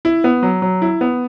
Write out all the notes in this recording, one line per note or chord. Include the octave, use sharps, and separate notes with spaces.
E4
B3
F#3
F#3
E4
B3